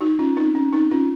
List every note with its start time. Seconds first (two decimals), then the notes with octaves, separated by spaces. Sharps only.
0.01 D#4 F#4
0.19 C#4 F4
0.37 C4 D#4
0.55 C#4
0.73 C4 D#4
0.91 C#4 F4